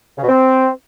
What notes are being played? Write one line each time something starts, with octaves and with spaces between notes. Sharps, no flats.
C#3
B2
C4